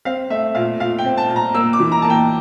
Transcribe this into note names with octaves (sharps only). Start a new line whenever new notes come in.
C4 F5
A3 E5
A#2 F5
A#2 F5
G5
C4
A5
A#2
A#5
A#3 E6
D6
E3
A#5
A#3 A5
G5